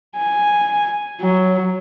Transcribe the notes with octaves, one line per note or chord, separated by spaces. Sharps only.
G#5
F#3